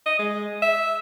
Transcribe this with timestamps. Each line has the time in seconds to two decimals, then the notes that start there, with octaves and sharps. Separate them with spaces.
0.06 D#5
0.19 G#3
0.62 E5